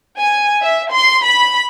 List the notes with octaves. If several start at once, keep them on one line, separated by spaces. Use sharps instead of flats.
G#5
E5
C6
B5